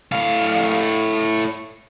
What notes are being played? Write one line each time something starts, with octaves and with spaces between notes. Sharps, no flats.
A2 F5